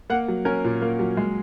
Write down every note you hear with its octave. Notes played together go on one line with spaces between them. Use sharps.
A#3 F#5
F#3
C#4 A#4
A#2
A#3
F#3
G#3